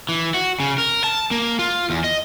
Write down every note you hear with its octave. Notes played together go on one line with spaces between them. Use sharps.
E3
F#4
C#3
A#4
A5
A#3
F4
E2
D#5